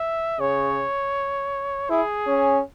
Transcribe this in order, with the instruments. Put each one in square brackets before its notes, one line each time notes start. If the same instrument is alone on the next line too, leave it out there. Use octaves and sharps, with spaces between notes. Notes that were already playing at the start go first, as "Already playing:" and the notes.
Already playing: [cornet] E5
[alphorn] C#3 [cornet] C#5
[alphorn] E4 [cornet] G#4
[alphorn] C#4